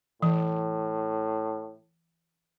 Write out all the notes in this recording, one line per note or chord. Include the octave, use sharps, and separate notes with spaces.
A2 E3